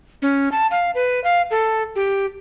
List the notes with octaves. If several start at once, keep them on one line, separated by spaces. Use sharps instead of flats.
C#4
A5
F5
B4
F5
A4
G4